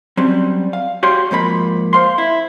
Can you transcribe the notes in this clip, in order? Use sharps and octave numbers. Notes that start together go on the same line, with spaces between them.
F#3 G3 C4 C#4
F5
F#4 G4 C#5 F5 C6
G#2 F3 A#3 B5
C5 F5 C6
E4